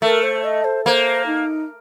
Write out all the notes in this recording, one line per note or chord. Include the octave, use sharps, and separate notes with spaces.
A3 A#4
C5
D#5
C5
A#3 C5
D#4